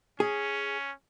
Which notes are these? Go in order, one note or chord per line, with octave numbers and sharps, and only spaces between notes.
C#4 G#4